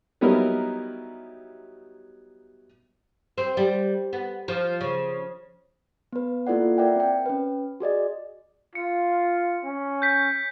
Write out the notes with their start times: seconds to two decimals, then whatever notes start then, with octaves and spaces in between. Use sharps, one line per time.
0.21 F#3 G3 B3 D#4 E4 A#4
3.38 C4
3.57 G3
4.13 B3
4.48 F3
4.81 C#3
6.13 B3 B4
6.47 A#3 E4 F4 A4 D5 F#5
6.78 A#4 D5 E5 F#5 G5
6.96 C4 G5
7.26 C#4 B4
7.80 F#4 G#4 D5 D#5
8.75 F4 C#7
9.64 C#4
10.02 G6 B6